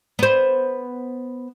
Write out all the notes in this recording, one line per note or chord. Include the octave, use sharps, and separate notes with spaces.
B3 C5